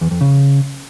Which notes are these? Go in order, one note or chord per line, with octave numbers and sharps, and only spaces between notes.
E2
F2
C#3